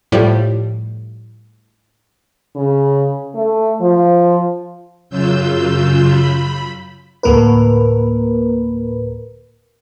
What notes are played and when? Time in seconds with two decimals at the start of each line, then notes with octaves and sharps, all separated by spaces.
0.12 A2 F3 G3
2.55 C#3
3.35 A3
3.81 F3
5.10 F#2 C#3 F#3 F4 E6 G6
6.09 B5
7.23 D2 A2 A#3 A#4 B4